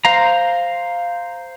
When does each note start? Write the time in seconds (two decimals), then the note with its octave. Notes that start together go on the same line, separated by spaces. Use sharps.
0.05 C5 F5 A#5